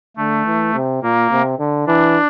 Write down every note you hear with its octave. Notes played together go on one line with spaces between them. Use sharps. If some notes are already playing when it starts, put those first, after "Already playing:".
D3 A3
E3
C3
A#2 A#3
C3
D3
E3 D4